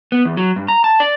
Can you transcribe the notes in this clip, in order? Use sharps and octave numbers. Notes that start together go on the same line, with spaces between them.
B3
E2
F#3
G2
A#5
A5
D5